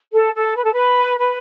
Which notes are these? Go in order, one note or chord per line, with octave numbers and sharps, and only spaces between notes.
A4
A4
B4
A4
B4
B4